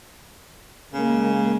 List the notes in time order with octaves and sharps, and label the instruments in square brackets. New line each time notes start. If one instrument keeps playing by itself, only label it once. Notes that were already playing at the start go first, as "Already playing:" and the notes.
[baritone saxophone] C#3 [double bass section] G#3 A#3